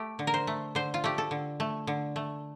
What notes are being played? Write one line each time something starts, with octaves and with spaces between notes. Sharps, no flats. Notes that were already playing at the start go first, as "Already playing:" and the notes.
Already playing: A3 G4
D3
A#4
C5
A3
D3 C5
F4
A3 G4
A4
D3
A3
D3
A3